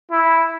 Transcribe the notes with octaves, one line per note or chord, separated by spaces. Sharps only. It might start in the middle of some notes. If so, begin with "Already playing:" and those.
E4